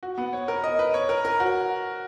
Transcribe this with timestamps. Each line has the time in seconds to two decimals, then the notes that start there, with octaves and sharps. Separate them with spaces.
0.03 F#4
0.18 B3
0.33 C#5
0.48 A#4
0.64 D#5
0.79 B4
0.94 C#5
1.09 A#4
1.25 A#4
1.40 F#4